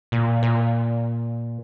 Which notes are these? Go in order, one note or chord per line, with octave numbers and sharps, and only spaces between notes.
A#2
A#2